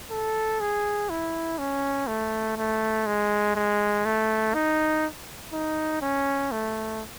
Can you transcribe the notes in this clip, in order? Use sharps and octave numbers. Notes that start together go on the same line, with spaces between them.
A4
G#4
E4
C#4
A3
A3
G#3
G#3
A3
D#4
D#4
C#4
A3